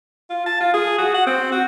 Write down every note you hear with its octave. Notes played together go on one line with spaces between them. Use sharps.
F4
A5
F4
G#4
F#4
F#5
C4
F#4